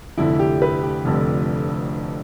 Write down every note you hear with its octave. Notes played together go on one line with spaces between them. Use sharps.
F1 F2 D3 E4
G4
B4
G4
F1 F2 D3